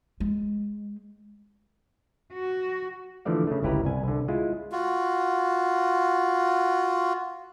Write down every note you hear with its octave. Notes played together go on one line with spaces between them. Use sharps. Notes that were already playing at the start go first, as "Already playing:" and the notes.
G#3
F#4
D3 E3 F3 A3 D5 F5
C#3 A3
G1 C#2 E4 G4 B4 A#5
C2 G#5
C2 D3
G#3 E4 F4
F4 F#4